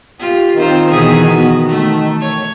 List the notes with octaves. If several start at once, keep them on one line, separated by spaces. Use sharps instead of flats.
F4 G4
D#3 C4 F4 C5
B2 E3 G#4
D#3 B3 F#4
A3
C#5